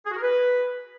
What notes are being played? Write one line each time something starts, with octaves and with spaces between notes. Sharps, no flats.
G#4
F#4
A#4
B4